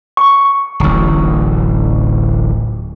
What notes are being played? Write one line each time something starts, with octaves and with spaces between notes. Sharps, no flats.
C#6
D1 A1